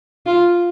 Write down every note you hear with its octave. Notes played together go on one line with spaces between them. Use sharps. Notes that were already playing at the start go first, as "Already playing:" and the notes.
F4